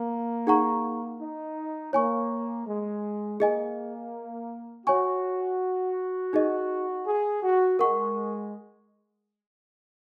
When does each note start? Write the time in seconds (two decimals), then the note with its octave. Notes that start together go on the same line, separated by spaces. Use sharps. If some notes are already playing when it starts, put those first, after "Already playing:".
Already playing: A#3
0.47 D#4 G#4 F#5 A#5 C#6
1.20 D#4
1.93 A#3 C#5 G#5 C#6
2.67 G#3
3.40 A#3 G#4 D#5 G#5
4.87 F#4 C#5 G#5 C#6
6.33 D#4 G#4 D#5
7.06 G#4
7.43 F#4
7.79 G#3 A#4 F#5 C#6